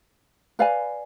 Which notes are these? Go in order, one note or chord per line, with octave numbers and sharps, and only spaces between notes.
B4 D5 F5 G#5